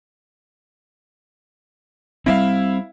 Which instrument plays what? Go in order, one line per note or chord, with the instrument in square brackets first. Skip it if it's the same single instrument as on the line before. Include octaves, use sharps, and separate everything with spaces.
[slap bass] G3 C4 [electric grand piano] E4 E5 F5